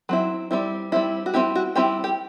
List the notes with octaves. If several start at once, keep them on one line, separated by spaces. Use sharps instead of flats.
F#3 C4 E4
G3 C4 E4
G3 C4 E4
F#4
G3 C4 E4 G4
F#4
G3 C4 E4 G4
G4